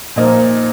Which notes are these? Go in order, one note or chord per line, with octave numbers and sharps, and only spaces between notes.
A#2 F3 A#3 D#4